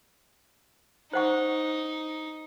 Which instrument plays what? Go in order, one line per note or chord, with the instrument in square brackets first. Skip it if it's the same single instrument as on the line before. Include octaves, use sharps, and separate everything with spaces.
[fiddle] D#4 [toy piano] C5 F#5 C#6